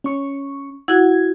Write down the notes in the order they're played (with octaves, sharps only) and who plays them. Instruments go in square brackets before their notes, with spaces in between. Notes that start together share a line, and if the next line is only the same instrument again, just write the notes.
[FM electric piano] C#4 C#6
[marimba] E4 F#4 [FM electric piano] F#5 G#6